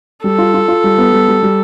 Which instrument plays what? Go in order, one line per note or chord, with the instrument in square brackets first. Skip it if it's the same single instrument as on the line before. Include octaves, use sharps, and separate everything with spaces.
[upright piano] G3 [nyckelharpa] A4
[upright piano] F4
F4
F4
G3
B3
G3
G3
G3